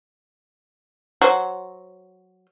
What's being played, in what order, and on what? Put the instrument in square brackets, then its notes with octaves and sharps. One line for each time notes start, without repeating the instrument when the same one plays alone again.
[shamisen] F#3 C5